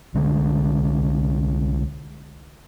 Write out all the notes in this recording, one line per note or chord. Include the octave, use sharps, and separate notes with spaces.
C2 D3 G#3